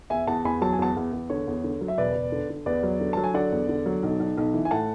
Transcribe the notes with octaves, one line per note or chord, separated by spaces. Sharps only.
E2 E5 G#5
E2 F#5 A5
E2 G#5 B5
F#3 A5
G#5
E2 F#5 A5
E2
E2
D3 C#5
E2
D3
F#3
E5
E1 B4 D5
E1
D3
D3
E2 B4 D5
F#3
D3
F#3 A5
G#5
D3 D5 F#5
E2
D3
F#3
B1
B1
B1
E3
G#5
A2 F#5 A5